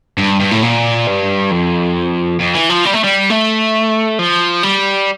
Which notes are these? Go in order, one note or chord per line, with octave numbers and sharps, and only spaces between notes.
G2
G2
A2
A#2
G2
F2
F2
E3
F3
G3
A3
G3
A3
F3
G3